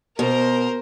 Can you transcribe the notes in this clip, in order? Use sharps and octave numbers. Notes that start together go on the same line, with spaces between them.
B2 A#4 C5